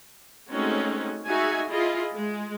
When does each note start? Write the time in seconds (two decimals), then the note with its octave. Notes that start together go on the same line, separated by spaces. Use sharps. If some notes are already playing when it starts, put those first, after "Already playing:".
0.49 G#3 A3 C4 C#4 D#4 F#4
1.27 D#4 F#4 G#4 E5 G#5
1.69 E4 F4 G#4 D#5
2.13 G#3